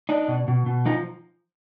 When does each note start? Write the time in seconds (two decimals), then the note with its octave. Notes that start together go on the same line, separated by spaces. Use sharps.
0.09 D4 D#4
0.28 B2
0.48 B2
0.66 B2
0.86 F3 D#4